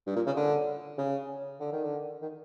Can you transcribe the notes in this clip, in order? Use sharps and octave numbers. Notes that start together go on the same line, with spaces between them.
G2
A#2
C#3
D3
C#3
D3
D#3
D3
D#3